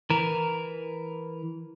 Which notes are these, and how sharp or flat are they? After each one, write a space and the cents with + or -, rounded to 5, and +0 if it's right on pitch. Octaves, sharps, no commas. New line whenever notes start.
E3 -5 A#4 +0